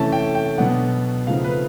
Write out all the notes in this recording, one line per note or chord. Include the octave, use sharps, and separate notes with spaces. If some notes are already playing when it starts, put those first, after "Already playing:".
Already playing: C3 E3 A3 C#4 A5
G5
G5
B2 F#3 B3 D4 F#5
C#3 F3 A3 C4 D#4 F5
B4